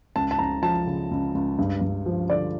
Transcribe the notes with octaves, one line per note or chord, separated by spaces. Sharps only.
C#2 A5
A5
C#2 A#5
F3 A5
C#3
C#2
C#2
G2
G2
F3
D3 D5